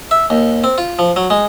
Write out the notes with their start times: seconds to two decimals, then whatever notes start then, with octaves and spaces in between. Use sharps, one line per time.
0.11 E5
0.30 D#2
0.64 C4
0.78 F4
0.99 F3
1.16 F#3
1.30 G#3